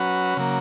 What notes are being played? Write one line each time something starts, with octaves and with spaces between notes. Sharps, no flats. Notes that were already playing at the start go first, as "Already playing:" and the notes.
Already playing: F#3 C#4 F#4 B4
C#3 F#3 A#3